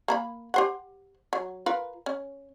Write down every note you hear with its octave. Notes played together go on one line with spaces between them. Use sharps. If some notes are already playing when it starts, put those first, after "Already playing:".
A#3 A#5 B5
G4 C5 F#5
F#3
F4 A#4 B4
C#4